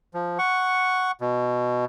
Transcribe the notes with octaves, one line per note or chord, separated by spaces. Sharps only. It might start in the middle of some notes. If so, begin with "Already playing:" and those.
F3
F#5 C#6
B2